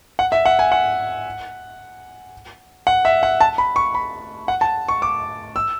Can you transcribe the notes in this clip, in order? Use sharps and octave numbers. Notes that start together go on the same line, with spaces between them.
F#5
E5
F#5
G#5
F#5
F#5
E5
F#5
A5
B5
C#6
B5
F#5
A5
C#6
D6
E6